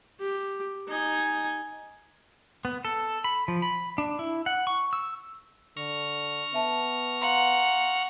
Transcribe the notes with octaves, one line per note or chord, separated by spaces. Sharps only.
G4
D#4 G#5
B3
A4
B5
F3
B5
D4
E4
F#5
C#6
E6
D3 C#6 F6 A#6
B3 E5 A5
F5 F#5 A#5 C6